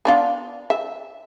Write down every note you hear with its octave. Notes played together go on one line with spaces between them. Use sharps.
B3 D4 F4
E5